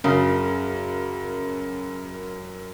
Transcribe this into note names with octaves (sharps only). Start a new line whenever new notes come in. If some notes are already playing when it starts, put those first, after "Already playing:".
F#2 C#3 C#4 A#4